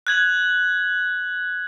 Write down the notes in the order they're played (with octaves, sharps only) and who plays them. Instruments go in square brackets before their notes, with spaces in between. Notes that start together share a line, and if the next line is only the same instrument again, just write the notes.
[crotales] F#6 G#6 F#7